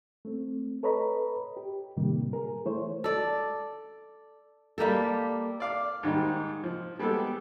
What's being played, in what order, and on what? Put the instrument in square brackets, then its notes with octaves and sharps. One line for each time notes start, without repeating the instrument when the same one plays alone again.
[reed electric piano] A3 C4
A4 B4 C#5 D#5 A#5 B5
G4
A2 C3 D#3 G3 A#3
G#4 A#4
E3 A3 E4 C5 C#5
[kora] A4 D5
G3 A#3 G4 A4
[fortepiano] D5 F5 D6
G#2 D#3 G3
F3
G3 G#3 B3 G4 A4